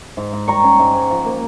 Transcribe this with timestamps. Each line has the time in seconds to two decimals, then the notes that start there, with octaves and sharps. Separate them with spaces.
0.17 G#2
0.33 G#2
0.48 G3 A#5 C#6
0.64 C#4
0.79 G#2
0.94 G#2
1.10 F3
1.25 A#3